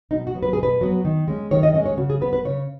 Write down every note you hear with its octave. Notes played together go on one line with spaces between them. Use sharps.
B2 D#4
F#4
F#3 B3
B4
G#4
B2
B4
F#3 B3
D#3
G#3 C#4
D#3 C#5
D#5
G#3 C#4 D#5
C#5
C#3 F#4
G#4
B3 B4
B4
C#3 C#5